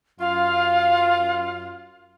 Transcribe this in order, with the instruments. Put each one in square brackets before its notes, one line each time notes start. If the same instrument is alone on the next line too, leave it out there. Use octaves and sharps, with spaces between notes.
[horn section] F#2 F4 [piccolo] F5